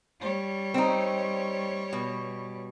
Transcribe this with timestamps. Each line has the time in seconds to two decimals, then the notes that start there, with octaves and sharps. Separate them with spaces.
0.20 G3 C#5
0.74 C4 D#4
1.93 B2